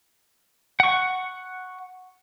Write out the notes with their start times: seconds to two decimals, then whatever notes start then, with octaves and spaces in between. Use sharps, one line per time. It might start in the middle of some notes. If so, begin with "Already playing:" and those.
0.80 F#5 C#6